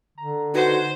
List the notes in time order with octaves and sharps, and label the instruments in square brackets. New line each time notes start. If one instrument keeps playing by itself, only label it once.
[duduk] D3 [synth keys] A#5
[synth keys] D#4 B4 G#6 [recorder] F#4 [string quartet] C5